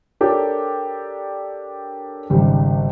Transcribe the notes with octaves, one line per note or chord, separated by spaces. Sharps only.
D4 G4 A4 A#4 C#5
G#1 C#2 G3